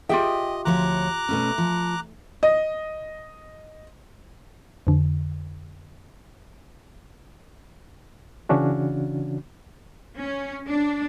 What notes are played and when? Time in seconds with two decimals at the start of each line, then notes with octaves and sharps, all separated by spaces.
0.09 F4 G4 G#4 D#5 E5 G5
0.65 D2 F3 C#5 A#5 D6 F#6
1.29 B2 A3 C#4
1.58 F3
2.43 D#5
4.87 F2 D3
8.49 C#3 E3 C#4 D4 F#4
10.19 C#4
10.69 D4